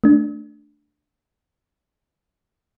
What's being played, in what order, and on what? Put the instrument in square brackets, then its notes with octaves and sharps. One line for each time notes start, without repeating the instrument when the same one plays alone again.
[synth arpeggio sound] A3 D4